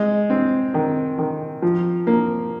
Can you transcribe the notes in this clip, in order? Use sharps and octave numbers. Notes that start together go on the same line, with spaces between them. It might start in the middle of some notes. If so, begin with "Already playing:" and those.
Already playing: G#3
C4
D#3
D#3
F3
A#3